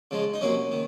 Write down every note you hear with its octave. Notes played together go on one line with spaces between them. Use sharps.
C#3 F3 G#3
D#4
C3 F#3 A#3 C#4
D#3